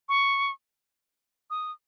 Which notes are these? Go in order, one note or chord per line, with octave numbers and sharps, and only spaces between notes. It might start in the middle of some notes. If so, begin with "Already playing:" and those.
C#6
D#6